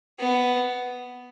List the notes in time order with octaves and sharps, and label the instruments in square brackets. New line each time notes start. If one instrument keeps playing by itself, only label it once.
[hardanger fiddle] B3